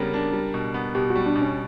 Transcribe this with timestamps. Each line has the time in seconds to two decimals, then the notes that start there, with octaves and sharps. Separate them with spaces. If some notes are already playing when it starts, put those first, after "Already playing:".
Already playing: C#3 G3 B3 D4 A#4
0.13 D4
0.33 G3
0.54 B2
0.74 B3
0.95 B2 G4
1.10 F#4
1.16 G3
1.26 D4
1.36 B2
1.41 C#4